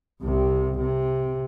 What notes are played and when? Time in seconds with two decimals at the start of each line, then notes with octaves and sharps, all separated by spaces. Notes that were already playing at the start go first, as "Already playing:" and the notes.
0.22 C2 C3
0.79 C3